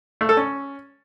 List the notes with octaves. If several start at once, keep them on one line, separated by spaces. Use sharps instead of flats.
A3
A4
C#4